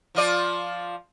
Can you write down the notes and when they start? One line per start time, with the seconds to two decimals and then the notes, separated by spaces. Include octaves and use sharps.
0.15 F3 F4 D5